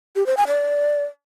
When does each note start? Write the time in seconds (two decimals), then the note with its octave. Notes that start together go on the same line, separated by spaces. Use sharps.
0.16 G4
0.26 C5
0.37 G#5
0.48 D5